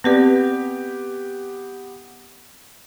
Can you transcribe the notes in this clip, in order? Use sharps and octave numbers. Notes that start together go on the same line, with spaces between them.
B3 C4 G4 B4 D5